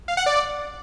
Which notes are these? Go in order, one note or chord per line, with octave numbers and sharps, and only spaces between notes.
F5
F#5
D5